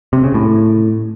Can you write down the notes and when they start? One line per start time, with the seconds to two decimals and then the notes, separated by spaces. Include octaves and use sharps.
0.13 C3
0.24 C#3
0.34 A2